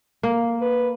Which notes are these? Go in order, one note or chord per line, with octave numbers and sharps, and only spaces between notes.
A#3
B4